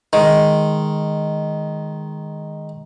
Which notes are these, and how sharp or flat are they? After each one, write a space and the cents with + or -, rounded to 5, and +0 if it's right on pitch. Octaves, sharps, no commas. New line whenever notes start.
D#3 +0 G#3 +0